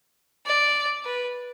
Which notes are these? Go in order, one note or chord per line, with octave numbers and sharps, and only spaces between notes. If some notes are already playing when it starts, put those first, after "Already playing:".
D5
B4